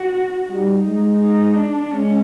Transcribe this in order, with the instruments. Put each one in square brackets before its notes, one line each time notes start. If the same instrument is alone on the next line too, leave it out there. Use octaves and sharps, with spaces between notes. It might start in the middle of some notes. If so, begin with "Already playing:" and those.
Already playing: [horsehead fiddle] F#4
[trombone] G3 [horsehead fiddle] D#4
[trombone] G#3
[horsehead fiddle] D#4
D4
[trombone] G#3 [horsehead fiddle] C#4